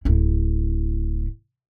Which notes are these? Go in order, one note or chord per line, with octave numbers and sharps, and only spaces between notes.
D1 E4